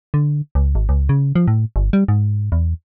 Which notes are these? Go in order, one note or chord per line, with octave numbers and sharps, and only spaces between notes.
D3
C#2
G#1
C#2
C#3
F3
A2
G1
G3
G#2
E2